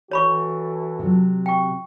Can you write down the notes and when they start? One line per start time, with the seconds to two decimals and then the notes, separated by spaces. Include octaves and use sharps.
0.11 E3 F#4 A4 C#5 B5 C#6
0.99 C3 F#3
1.46 G5 C#6